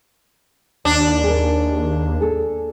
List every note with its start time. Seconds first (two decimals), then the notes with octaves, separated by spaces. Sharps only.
0.85 D#2 D4
1.24 G#4 A#4
2.21 G#4 A4